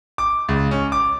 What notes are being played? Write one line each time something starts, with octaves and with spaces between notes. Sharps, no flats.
D6
C#2
C#4
D6